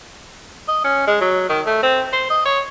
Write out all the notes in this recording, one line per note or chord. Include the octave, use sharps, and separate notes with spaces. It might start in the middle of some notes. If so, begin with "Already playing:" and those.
D#5
C#4
G#3
F#3
D#3
A3
C4
C5
D#5
C#5